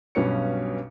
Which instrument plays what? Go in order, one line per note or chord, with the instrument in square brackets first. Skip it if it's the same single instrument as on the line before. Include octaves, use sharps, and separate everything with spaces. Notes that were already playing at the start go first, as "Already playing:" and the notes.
[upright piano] B1 G2 B2 C#4 C#7